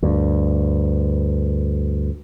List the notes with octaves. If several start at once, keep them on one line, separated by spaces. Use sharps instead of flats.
D2 G2